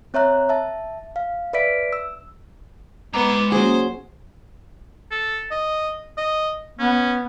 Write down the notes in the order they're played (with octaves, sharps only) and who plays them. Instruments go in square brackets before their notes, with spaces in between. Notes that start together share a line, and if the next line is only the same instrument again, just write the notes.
[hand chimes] C4 C#5 E5 A#5 F#6
E5 A5
F5
B4 D5 E5 B6 D7
E6
[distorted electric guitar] G#3 A#5 [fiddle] B3 [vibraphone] D6
[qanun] F#3 G#4 [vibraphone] A#3 C#4 [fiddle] C5
[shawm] A4
D#5
D#5
[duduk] B3 [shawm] C#4